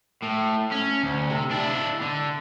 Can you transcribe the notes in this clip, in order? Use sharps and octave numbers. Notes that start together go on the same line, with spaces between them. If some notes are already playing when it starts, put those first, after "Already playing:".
A2
C#4
D2
C3
D4 E4
D3